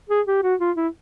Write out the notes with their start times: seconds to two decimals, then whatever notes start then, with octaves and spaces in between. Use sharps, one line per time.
0.09 G#4
0.27 G4
0.43 F#4
0.60 F4
0.76 E4